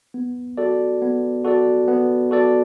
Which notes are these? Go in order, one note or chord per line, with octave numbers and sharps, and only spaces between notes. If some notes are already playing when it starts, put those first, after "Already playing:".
B3
F#4 A4 D5
B3
F#4 A4 D5
B3
F#4 A4 D5